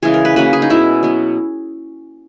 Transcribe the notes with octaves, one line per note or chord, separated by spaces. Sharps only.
C#3 E3 G#3 G#4
A#4
B4
F#3 A#3 C#4 B4
G#4
D#4
B2 G#3 C#4 E4
F#3 B3